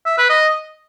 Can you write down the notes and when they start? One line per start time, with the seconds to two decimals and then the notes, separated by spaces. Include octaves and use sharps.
0.06 E5
0.18 B4
0.30 D#5